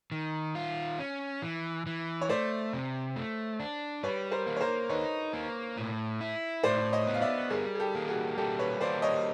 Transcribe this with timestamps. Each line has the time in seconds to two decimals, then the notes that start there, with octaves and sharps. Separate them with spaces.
0.12 D#3
0.55 F4
0.99 C#4
1.42 E3
1.86 E3
2.21 C#5
2.29 A3 C5 D5
2.73 C3
3.16 A3
3.60 D4
4.03 G3 B4 C#5
4.32 A#4 C5
4.46 A#3
4.56 C#5
4.61 A#4 C5
4.89 D#4 B4 C#5
5.33 A#3
5.77 A2
6.21 E4
6.63 A2 C5 D5
6.93 C#5 D#5
7.07 B3
7.14 F5
7.22 D5 E5
7.50 G3 G#4 A#4
7.75 G#4
7.80 G4 A4
7.95 A#3
8.08 F#4 G#4
8.37 G3 G4 A4
8.59 B4 C#5
8.81 A#3 C5 D5
9.02 C#5 D#5